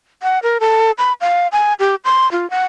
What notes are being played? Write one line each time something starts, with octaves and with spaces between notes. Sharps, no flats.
F#5
A#4
A4
B5
F5
G#5
G4
C6
F4
F#5